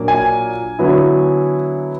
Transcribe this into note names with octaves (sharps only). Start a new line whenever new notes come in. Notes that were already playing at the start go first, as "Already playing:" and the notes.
Already playing: A#2 F#3 A#3 D4
G#5
D3 F#3 B3 E4